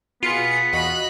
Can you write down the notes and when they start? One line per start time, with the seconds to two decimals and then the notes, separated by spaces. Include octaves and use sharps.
0.23 B2 B3 F4 G#4 C#7
0.73 E2 F#4 D#5 B5 F#6